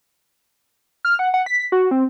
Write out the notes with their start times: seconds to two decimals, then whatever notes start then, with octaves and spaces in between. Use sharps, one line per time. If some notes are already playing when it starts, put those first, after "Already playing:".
1.05 F6
1.19 F#5
1.34 F#5
1.46 B6
1.72 F#4
1.91 C4